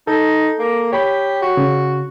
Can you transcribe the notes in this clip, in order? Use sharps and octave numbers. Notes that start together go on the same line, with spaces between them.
D#4 A4
A#3
G4 C#5 B5
F#4
C#3